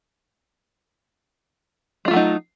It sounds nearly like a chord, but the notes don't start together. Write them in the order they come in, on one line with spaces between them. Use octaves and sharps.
G#3 F4 A3 F#3 D#4